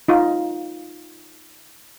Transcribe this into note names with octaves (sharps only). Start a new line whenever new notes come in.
D#4 F4